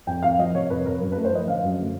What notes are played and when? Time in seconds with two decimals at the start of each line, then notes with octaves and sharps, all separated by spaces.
0.07 F2 G5
0.23 F2 F5
0.38 F3 D#5
0.55 C3 C#5
0.70 F2 B4
0.85 F2 A#4
1.01 F#2
1.12 B4
1.16 A3
1.25 C5
1.32 F3 D#5
1.47 D3 F5
1.63 F#2
1.78 A3